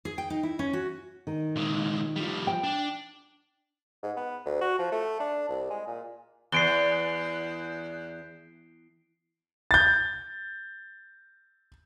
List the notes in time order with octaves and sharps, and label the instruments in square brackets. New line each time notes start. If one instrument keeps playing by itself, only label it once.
[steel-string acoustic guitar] G#4
G5
D#4
E4
C#4
F#4
[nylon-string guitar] D#3
[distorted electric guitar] A#2 G#3
F3 G3
[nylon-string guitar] G5
[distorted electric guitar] D4
[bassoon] G#2
B3
D2
F#4
F3
A3
D4
C2
G#3
A#2
[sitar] E2 [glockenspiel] C7 D7 G7
[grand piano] G6 A6